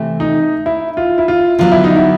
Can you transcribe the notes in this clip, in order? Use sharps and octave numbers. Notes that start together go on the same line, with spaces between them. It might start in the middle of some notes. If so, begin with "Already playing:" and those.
Already playing: C3 E3 A3 C4
D#4
E4
F4
E4
F4
D3 F#3 B3 F4
E4
D#4
E4